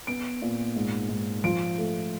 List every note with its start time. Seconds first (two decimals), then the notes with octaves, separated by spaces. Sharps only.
0.07 B3 D7
0.42 A#2
0.76 G#2
1.09 G#2
1.44 F3 D7
1.78 A3